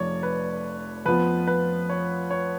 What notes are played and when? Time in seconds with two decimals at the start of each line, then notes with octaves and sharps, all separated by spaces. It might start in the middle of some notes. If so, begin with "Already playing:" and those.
Already playing: F1 F2 C#5 D5
0.23 B4
1.06 F2 F3 B3 B4
1.47 B4
1.90 C#5
2.31 C#5